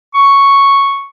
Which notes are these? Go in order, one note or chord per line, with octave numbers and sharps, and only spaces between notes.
C#6